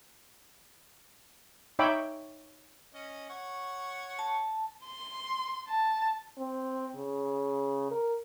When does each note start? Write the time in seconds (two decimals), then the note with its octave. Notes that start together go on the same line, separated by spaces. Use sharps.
1.79 D#4 C#5 E5 G5 B5 D6
2.94 C#4 D#5
3.30 C#5 F#5 C#6
4.19 A5
4.85 C6
5.68 A5
6.38 C4
6.96 C#3
7.91 A#4